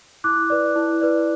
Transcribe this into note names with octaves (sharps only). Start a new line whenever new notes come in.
E4 D6 F#6
B4 D5
E4
B4 D5